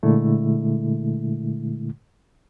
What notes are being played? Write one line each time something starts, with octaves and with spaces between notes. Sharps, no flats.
A#2 D3 G#3 A3 E4